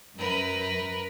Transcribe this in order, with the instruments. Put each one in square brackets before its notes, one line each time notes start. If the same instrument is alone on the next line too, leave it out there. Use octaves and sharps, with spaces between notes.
[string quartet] F#2 [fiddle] A#4 B4